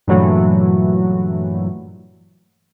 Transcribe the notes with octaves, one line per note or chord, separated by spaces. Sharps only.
G2 A#2 E3 F#3 A3 F#4